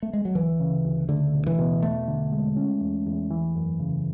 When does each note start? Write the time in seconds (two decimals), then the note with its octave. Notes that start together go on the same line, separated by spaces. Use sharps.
0.02 A3
0.13 G#3
0.25 F#3
0.35 D2 E3
0.60 C#3
0.84 D2
1.09 D3 A3
1.34 B2
1.46 E3
1.58 B2
1.83 E2 A3
2.08 D3
2.32 G#3
2.57 C#4
2.81 E2
3.06 E2
3.30 E3
3.55 F#2
3.80 C#3